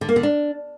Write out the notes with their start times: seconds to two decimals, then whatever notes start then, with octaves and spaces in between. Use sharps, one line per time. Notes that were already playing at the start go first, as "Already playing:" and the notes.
0.01 D3
0.09 A#3
0.16 D3
0.23 D4